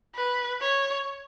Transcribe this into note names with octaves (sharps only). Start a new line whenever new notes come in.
B4
C#5